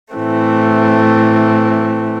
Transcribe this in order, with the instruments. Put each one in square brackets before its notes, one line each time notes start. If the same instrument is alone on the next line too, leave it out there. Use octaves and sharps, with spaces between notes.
[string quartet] A2 E3 A3 C4